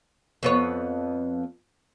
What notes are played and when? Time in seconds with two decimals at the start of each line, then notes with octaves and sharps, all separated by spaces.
0.43 F2 B3 C#5